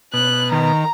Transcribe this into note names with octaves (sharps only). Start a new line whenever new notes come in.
B2 F#6
D#3 A#5